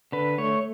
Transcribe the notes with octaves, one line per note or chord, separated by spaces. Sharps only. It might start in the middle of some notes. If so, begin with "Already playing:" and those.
D3 B4
A3 C#5